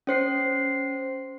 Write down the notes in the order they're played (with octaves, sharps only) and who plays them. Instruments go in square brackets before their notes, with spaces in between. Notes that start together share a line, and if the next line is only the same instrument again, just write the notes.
[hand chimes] C#4 C5 C7